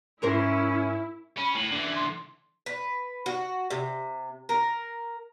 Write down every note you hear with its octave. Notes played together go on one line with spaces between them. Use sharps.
G#2 C#4 E4 A#4 C5
C#4 B5
A2 F#7
D3 E3
C6
B4
F#4
C3
A#4